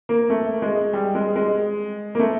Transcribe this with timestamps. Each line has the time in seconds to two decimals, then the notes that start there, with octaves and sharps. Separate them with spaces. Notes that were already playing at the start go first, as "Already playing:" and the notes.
0.09 A#3
0.30 A3
0.62 G#3
0.93 G3
1.15 G#3
1.36 G#3
2.15 A#3
2.19 A3